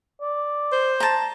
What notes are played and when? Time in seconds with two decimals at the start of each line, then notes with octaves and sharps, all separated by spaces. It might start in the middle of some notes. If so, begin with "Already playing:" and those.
0.21 D5
0.72 C5
1.00 A5 A#5